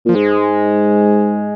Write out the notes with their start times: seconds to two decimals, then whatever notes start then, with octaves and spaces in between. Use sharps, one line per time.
0.05 A#2 F3
0.14 G#2 G#3